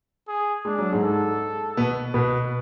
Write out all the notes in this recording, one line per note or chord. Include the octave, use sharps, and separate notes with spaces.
G#4
G#3 D4
F#3
G#2 G#3
A4
B2 B3
B2 B3 B4